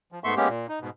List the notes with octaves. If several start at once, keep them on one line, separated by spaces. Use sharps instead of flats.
F3
G#2 A3 B3 E5 C6 C#6
G#3 A#3 B3 C#4 G4
A#2
D#4
G#2 B2